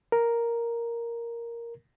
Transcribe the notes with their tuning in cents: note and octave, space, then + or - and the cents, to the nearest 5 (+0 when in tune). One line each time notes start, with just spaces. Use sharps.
A#4 +0